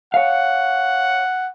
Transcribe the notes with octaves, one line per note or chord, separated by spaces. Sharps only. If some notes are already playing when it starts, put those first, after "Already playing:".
C#5 F5 F#5